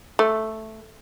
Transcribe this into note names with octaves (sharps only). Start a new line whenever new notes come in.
A3